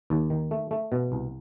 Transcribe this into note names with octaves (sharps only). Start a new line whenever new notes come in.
D#2
D#3
A3
A3
B2
C2